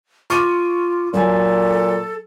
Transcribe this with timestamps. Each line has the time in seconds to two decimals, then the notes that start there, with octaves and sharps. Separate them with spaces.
0.30 F4 C#6 D6 D#7
1.14 A#2 F#3 A4 G#5